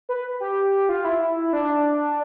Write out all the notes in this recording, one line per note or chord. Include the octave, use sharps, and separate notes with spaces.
B4
G4
F4
E4
D4